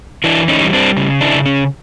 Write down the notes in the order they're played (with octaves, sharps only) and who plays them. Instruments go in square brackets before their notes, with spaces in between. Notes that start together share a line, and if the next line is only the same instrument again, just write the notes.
[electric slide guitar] E3 D4 E4
C#4 D#4
G3
C4 D4
C#3
D4 E4
C#3
C#4